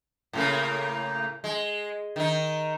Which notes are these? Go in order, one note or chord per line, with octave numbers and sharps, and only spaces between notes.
A2 C#3 A#3
G#3
D#3 D#4